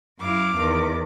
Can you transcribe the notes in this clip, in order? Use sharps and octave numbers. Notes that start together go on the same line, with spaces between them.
F#2 E4 F5 D6
E2 D#3